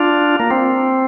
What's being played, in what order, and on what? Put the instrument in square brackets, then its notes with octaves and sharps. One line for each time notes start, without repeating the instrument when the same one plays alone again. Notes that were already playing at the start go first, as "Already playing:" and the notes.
Already playing: [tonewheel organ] D4 F4
A#3
C4